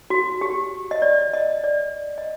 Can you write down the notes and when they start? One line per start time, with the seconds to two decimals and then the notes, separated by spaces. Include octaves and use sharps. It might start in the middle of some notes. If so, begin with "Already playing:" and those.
0.10 F#4
0.41 G4
0.91 D#5
1.02 D5
1.33 D#5
1.64 D5
2.18 D#5